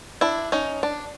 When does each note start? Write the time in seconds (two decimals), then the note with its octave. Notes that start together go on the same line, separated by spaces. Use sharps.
0.21 D4 E4
0.52 C#4 D#4
0.83 D4